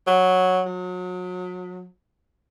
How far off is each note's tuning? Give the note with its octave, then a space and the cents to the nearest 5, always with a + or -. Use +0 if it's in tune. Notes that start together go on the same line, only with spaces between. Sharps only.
F#3 -5
F#3 -35